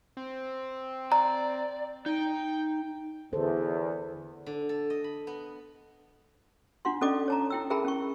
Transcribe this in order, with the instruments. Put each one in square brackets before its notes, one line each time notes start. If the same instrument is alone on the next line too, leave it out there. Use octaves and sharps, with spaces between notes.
[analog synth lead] C4
[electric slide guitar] D5 [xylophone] A#5
[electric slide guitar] D#4 [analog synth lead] G5
[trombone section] E2 [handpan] D3 A4 C5
[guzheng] D3
A4
D#5
B5
B3
[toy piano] D4 F4 F#5 C6
C#4 A4 D5 D#5 D6
C#5 A5 A#5
E4 G5 E6
G#4 A#4 E5 G5 A5 B5
C#4 C#6